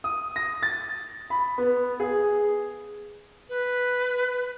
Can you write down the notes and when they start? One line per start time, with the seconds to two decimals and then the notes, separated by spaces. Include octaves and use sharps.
0.04 D#6
0.36 A#6
0.63 A6
1.30 B5
1.58 B3
2.00 G#4
3.49 B4